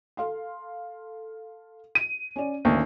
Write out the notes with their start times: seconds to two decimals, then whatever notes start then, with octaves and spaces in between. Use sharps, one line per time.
0.17 A4 F5 C6
1.95 D#7
2.36 C#4 D5
2.65 D2 D#3 A#3 C#4